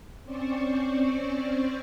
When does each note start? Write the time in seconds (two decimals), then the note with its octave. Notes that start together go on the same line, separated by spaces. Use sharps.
0.24 C4 C#4 C5 D5 C#6